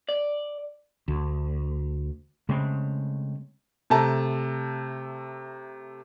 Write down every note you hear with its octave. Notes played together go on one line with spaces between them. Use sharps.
D5
D2
C#3 G#3 A3 C4
C3 A3 A5 A#5